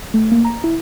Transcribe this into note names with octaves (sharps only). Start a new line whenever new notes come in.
A3
A#3
A#5
E4